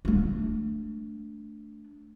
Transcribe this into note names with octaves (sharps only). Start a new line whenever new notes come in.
A3 D4